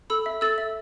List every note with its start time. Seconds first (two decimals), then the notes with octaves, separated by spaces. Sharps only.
0.10 A4 B5 E6
0.26 E5
0.41 A4 E6 A6
0.58 E5